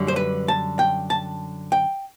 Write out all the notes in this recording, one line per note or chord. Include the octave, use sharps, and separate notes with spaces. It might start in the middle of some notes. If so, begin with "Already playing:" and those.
Already playing: F#2 D3 G3
C5
B4
A5
G5
A5
G5